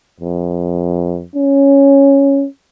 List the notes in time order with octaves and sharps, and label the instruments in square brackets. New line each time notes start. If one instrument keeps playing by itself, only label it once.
[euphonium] F2
C#4